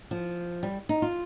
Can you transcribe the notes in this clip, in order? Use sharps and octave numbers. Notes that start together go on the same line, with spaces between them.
F3
G3
D#4
F4